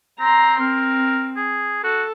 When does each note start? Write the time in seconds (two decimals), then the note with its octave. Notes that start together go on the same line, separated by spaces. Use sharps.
0.20 C4 A#5 C6
0.60 C4 A#4
1.37 G#4
1.84 F#4 A4